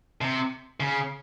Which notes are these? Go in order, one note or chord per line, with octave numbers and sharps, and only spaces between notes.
C3
C#3